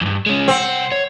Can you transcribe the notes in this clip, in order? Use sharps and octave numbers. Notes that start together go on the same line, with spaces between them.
E2 G2
G#3 C#4
C2 C4 F#5
C#5